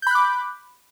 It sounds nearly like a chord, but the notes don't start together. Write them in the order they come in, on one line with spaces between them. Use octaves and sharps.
G6 B5 F#6 D6